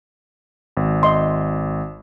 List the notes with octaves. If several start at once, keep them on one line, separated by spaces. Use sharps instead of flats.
G#1
D#5 C6